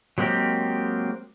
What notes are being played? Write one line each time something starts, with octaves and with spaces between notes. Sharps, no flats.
F#3 G#3 A#3 C4 G4